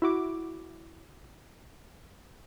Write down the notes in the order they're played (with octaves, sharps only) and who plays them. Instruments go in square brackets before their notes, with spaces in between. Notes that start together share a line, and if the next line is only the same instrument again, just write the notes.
[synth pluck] E4 F#4 D6